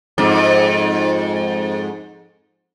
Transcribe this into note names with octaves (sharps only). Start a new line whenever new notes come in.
F2 G#2